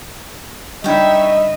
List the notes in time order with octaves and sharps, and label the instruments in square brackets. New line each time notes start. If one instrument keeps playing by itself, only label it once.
[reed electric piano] G3 D4 B5 [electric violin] D#4 E5 [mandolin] C#5 G5 [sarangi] D#5